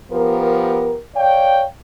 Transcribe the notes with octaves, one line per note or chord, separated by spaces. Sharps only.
F3 B3 G4 A#4
C#5 D5 F5 G5